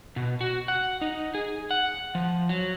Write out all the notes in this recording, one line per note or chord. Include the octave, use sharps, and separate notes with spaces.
B2
F#4
F#5
D#4
G#4
F#5
F3
F#3